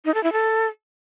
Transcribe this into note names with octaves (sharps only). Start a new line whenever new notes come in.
D#4
A4
E4
A4